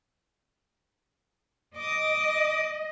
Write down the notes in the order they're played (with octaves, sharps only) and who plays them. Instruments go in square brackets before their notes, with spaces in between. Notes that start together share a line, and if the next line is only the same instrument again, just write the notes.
[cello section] D#5 [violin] D6 D#6